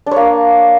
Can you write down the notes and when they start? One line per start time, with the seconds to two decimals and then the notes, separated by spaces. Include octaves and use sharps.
0.06 D4
0.11 C#5
0.16 A#3